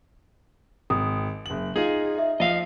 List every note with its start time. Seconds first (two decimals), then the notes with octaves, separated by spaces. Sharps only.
0.90 G#1 D#6
1.46 F#1 F#7
1.76 D#4 F4 G#4
2.18 E5
2.40 F3 D#5 F5